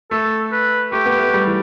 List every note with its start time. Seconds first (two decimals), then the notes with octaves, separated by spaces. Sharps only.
0.11 A3 A4
0.52 B4
0.92 A3 G4
1.06 B3
1.17 A3
1.34 G3
1.47 E3